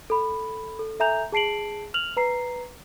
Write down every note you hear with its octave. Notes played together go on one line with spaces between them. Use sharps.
A4 B5
A4
A4 E5 G#5 A#5 G6 F7
G#4 A5 C7 D7 F#7
F6 F7 F#7
B4 A#5 C7